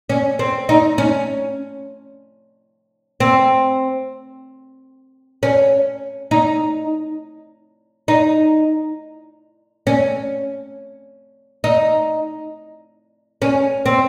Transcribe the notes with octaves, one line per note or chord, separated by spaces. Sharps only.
C#4
C4
D#4
C#4
C4
C#4
D#4
D#4
C#4
D#4
C#4
C4